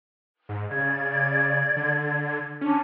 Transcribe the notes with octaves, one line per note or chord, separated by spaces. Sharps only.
G#2
C#3 D5 G#6
D3
C#4 D4